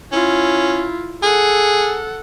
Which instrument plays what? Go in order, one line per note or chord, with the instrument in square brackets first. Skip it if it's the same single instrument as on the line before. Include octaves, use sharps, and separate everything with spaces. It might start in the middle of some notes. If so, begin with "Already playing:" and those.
[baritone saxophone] C#4 [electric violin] E4 F4
[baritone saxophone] G#4 [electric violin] A4 F#5